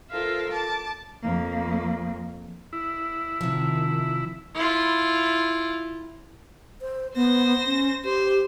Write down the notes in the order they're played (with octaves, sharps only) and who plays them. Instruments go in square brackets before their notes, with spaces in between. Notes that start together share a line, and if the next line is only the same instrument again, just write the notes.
[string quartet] F4 A4 A#4 C5 E5 F5
A5 D6 A6
[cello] F2 A#3
[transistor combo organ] E4
[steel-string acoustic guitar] C3 F3 [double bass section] D#3
[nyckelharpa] E4 F4
[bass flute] C5
[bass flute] B3 [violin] C5 A#6
[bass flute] C#4
[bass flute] G4 [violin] C5